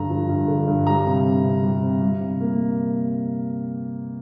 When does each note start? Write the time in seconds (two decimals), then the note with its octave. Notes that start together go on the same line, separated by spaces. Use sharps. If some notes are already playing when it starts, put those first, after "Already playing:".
Already playing: G2 D3 A#5
0.10 F3
0.29 G2
0.48 D3
0.67 G2
0.87 G3 A#5
1.06 C3
1.25 C4
1.44 C3
1.63 G3
1.83 C3
2.02 G3
2.21 C3
2.40 A#3